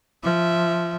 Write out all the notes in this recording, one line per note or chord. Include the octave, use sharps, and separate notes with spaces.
F3 E5